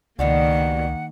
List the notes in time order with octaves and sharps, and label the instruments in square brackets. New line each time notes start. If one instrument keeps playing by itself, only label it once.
[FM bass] C#2 [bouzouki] B2 G3 D4 [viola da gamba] D#3 A#3 [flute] F#5